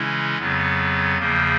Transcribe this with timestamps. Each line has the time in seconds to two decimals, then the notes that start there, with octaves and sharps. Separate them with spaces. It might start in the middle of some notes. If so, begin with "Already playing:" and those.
Already playing: C#3 E3 G#3 C#4 E4
0.38 F2 C#3 F#3 B3
1.18 E2 C#3 F3 A#3